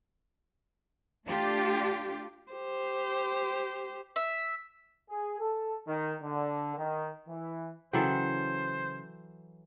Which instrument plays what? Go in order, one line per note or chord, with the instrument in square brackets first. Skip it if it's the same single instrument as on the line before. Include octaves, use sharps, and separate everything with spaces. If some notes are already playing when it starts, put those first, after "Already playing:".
[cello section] A3 D4 F4 G4
[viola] G4 C5
[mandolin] E5
[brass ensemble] G#4
A4
D#3
D3
D#3
E3
[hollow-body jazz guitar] C#3 G#4 G5 [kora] E3 F#3 A4 [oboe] C5